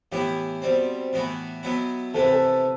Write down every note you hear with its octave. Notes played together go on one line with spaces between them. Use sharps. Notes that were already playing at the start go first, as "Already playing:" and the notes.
A2 E3 B3 E4 G4
B2 G3 C4
A2 E3 B3 F#4
B2 F#3 B3 E4
C3 E3 A3 A4
B4
A4